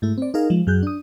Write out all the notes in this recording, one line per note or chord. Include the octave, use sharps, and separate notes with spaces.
G#2 A3 E4
C4 D5
D#4 G#4 A#4 F5
F3 G#3
F#2 F#3 G#4 F#6 G6
D4 D#6